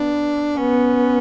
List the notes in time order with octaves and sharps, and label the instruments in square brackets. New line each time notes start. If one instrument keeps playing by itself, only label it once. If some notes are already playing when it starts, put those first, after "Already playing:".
Already playing: [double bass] B3 [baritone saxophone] D4
[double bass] B3 [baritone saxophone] C#4